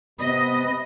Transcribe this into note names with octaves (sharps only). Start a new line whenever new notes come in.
C3 B3 D#5 B5 D#6